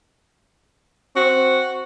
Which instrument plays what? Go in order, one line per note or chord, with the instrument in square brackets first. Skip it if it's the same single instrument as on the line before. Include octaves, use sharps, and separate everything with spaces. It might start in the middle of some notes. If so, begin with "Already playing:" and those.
[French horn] C4 [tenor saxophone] F#4